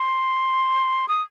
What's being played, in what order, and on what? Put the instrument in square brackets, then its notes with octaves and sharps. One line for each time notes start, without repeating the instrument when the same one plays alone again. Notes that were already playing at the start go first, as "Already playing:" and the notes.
Already playing: [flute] C6
D#6